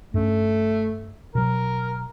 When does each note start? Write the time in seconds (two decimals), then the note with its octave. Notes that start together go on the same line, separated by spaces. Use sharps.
0.14 G2 A3 C#4
1.35 B2 F#3 A#4